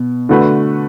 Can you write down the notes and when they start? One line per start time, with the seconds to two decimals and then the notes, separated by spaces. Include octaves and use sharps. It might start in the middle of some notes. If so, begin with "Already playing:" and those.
Already playing: B2
0.29 D3 A3 F#4 B4